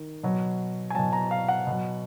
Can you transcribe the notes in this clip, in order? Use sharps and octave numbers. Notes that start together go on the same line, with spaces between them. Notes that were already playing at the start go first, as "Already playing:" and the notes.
Already playing: D#3
B2 F#3
G#5
B2 F#3 A5
A#5
F5
F#5
B2 F#3